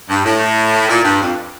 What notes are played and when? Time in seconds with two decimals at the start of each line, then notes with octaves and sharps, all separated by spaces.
0.09 G2
0.25 A2
0.89 A#2
1.05 G2
1.21 F2